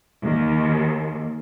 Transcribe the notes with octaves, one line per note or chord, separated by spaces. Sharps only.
D#2